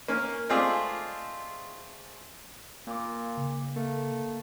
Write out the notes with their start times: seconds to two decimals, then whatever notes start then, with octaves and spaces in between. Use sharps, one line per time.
0.08 A#3 C#4
0.49 G#3 A3 C4 F4 G#4 D5
2.87 A#2 A#3 D6
3.37 C#3
3.76 A3 A#3